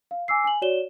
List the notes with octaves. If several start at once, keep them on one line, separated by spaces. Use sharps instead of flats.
F5
G#5 D6 E6 C7
G#5 F#7
F#4 C#5 D5 E7 G7